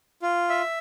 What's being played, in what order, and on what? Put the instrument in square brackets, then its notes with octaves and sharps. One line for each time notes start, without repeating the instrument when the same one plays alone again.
[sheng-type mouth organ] F4
E5